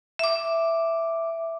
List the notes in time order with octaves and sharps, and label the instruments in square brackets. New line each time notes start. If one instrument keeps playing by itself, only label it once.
[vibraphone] E5 D6